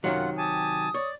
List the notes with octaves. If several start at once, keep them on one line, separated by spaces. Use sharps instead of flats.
F#2 C3 D#3 F#3 F4 F#5
G4 G#5 A5 D#6
C#5 D5